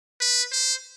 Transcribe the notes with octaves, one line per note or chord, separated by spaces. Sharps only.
B4
C5